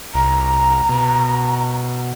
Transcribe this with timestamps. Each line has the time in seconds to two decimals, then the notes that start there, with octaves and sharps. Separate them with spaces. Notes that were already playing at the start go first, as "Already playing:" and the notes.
0.15 C2 A#5
0.89 B2